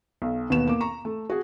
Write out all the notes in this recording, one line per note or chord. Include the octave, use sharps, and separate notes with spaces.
B1
D#2 B2 B3 E7
A#3 D6
A#5 C#6
A3
F#4 G#4